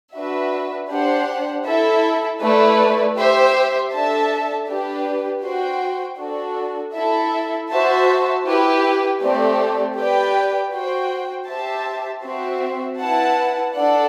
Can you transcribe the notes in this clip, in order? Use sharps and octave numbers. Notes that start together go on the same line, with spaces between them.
D4 F#4 B4 E5
D4 G4 C5 F#5
E4 A4 E5
A3 E4 B4 D5
G4 C5 E5
D4 A4 E5 A5
D4 G4 B4
F#4 C5 G5
D4 F#4 A4
E4 A4 E5
F#4 C5 E5 A5
E4 G4 B4
A3 C4 G4 D5
G4 B4 D5 G5
F#4 C5 G5
G4 C5 E5 A5
C4 F#4 C5 E5
E4 B4 F#5 A5
D4 A4 D5 F#5